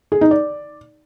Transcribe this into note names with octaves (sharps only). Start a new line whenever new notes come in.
G#4
D#4
D5